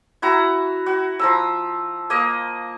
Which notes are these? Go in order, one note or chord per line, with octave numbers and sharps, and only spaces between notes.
E4 F#4 A#5
F#4
F3 A#5 E6
A#3 D#5